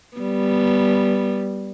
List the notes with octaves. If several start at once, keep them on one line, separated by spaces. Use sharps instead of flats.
G3 B3